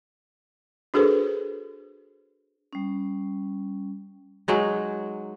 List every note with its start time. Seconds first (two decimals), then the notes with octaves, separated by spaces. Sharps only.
0.94 D4 F#4 G#4 A4 B4 C5
2.73 G3 C#4
4.48 F#3 G#3 D#4